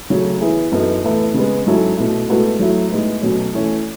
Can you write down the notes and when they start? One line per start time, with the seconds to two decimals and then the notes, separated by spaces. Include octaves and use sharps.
0.10 C#3 F#3 A3 C#4
0.41 E3 B3 E4 G#4
0.72 F#2 E3 B3 D#4 A4
1.03 A2 E3 B3 E4 A4
1.34 C#3 G#3 B3
1.66 G#2 F#3 C#4 E4 A4
1.97 B2 A3 E4
2.28 A2 G#3 B3 F#4 A4
2.59 F#3 A3 E4
2.90 A2 G#3 B3 D#4
3.21 B2 F#3 A3 C#4
3.53 E3 A3 C#4